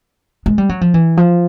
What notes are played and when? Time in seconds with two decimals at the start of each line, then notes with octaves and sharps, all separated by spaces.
0.46 G#3
0.58 G3
0.69 F#3
0.81 F3
0.94 E3
1.17 F3